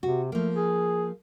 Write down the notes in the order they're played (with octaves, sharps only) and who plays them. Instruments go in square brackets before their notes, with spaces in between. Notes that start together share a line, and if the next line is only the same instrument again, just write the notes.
[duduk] C3 [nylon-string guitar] F#4
[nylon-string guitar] F3 A#3 [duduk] A3
[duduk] G#4